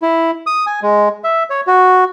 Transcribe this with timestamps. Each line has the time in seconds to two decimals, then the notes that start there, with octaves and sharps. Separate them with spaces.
0.02 E4
0.47 D#6
0.67 G#5
0.82 G#3
1.24 E5
1.50 C#5
1.67 F#4